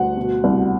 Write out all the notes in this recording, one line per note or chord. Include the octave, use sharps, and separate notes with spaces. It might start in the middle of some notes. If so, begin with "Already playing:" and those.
Already playing: D2 G3 F#5
B2
C2